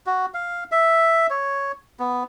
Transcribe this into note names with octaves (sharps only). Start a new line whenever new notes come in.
F#4
F5
E5
C#5
B3